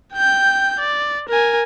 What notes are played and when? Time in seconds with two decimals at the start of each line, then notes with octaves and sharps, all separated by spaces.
0.15 G5 G6
0.80 D5
1.29 A#4 G#5